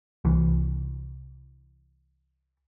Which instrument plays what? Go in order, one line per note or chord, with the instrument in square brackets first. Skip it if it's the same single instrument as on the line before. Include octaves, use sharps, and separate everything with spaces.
[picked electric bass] C2 E3